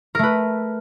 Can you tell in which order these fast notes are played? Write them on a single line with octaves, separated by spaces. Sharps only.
A#4 A3 B4